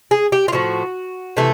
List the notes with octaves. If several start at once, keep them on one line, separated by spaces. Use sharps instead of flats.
G#4
G4
F4
A2 F3 A3 F#4
C3 E3 A3